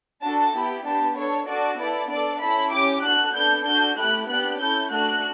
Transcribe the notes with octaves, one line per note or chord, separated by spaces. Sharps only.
D4 F#4 A4 A5
B3 E4 G4
B3 D4 G4 A5
D4 A4 C#5
D4 F#4 A4 D5
B3 E4 A4 D5
D4 A4 D5
C#4 E4 A4 B5
C#4 G4 D6
D4 F#4 A4 F#6
B3 D4 A4 G6
D4 F#4 A4 G6
A3 E4 G4 F#6
B3 D4 G4 F#6
C#4 E4 A4 G6
A3 D4 F#4 A4 F#6